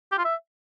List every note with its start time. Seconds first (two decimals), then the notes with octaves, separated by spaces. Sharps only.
0.12 G4
0.18 F4
0.25 E5